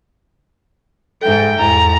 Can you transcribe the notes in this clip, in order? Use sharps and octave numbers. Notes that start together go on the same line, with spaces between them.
G#2 A4 E5 G5
E2 G#2 A#5